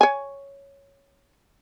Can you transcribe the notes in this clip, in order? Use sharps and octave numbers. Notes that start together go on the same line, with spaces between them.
C#5 G#5